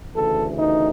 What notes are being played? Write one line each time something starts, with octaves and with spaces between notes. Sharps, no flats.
D2 C#3 E3 A4
D#4